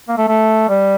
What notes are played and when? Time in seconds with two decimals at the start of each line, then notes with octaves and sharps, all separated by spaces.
0.08 A#3
0.17 A3
0.28 A3
0.68 G3